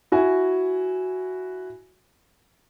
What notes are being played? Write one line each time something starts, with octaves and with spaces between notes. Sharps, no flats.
E4 F#4 G#5